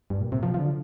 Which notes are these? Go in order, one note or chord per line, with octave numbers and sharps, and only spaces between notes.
G2
A#2
C3
F3
F3
D3